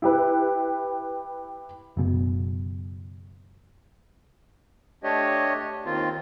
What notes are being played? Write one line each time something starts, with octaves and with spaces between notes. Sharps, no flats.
E4 G4 B4
F#1 B2
A3 D4 G4 C#5 D#5
D#2 D#3 C4 F4